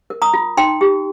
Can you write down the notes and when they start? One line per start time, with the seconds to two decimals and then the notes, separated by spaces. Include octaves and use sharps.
0.10 A#4
0.22 A#5 D#6
0.33 F4
0.57 D#4 G5 C6
0.81 G4